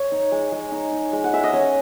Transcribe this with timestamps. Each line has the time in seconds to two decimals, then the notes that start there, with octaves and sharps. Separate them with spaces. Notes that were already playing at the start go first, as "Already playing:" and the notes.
Already playing: C#5
0.12 D#4
0.32 G#3
0.52 G#3
0.72 D#4
0.92 D#4
1.13 G#3
1.24 F#5
1.33 G#3 E5
1.44 D#5
1.53 C#4 C#5